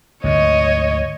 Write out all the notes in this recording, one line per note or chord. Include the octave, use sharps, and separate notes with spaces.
D2 G#2 D3 C#5 D#5